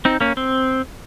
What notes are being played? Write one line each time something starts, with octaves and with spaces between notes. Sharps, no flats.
C4 D#4
A#3 C#4
C4